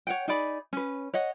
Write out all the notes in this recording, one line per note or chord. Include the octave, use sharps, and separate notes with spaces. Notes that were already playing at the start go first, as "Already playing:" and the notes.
C#5 F#5 G5
D#4 G#4 D5 B5
C#4 B4
C#5 D#5 F#5